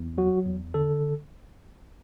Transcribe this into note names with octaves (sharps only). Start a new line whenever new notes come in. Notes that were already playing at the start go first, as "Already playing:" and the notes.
Already playing: E2
F#3 F#4
E2
D3 A4